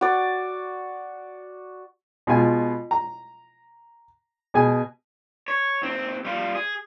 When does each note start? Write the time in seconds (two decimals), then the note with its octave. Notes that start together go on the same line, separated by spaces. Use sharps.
0.01 F#4 D5
2.27 B2 G#3 F4 G#5
2.91 A#5
4.54 B2 G#4 G#5
5.48 C#5
5.82 D#2 C4
6.25 G3 F4
6.55 G#4